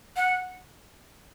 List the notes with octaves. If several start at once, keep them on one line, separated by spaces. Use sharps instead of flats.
F#5